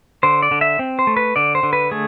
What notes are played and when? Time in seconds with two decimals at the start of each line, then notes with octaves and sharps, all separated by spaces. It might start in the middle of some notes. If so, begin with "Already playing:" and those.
0.23 D3 C5
0.42 D5
0.51 D3
0.61 E5
0.79 C4
0.99 C5
1.07 A3
1.17 B4
1.36 D3 D5
1.55 C5
1.63 D3
1.73 B4
1.91 A3 G#4